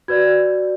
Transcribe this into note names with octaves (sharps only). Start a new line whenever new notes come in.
F#4 B4 D5 G#6